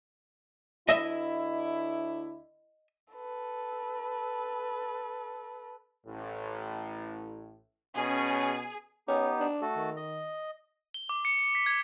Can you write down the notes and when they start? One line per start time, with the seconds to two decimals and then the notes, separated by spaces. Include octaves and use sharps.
0.89 D2 D3 E4 D#5 E5
3.14 A4 B4
6.07 A1 A2
7.97 B2 C#4 G#4
9.08 B3 C#4 D#4 G4
9.40 D4
9.62 A3 F#4 A4
9.76 D#3
9.97 D#5
10.94 G7
11.09 D6
11.25 C#7
11.39 C#7
11.55 B6
11.66 G#6